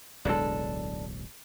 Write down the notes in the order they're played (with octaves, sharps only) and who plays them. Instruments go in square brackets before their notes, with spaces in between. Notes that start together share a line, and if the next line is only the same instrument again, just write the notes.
[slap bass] D1 B1 G#3 [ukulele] D4 A4